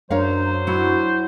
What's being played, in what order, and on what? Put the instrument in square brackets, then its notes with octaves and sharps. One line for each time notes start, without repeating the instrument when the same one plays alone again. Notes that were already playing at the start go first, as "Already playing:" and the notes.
[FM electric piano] F#2 D4 [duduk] F#3 [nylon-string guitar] A#4 C#5 F5 [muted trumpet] C5
[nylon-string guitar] F#3 E4 [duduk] F#4